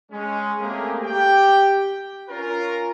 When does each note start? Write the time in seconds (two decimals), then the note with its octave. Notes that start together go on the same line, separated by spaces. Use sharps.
0.11 G#3 C#4
0.60 A3 A#3 C4 G4 G#4 A#4
1.04 G4 G5
2.29 C#4 F4 A#4